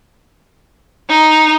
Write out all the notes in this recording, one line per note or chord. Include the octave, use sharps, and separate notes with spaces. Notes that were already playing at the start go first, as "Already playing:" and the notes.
D#4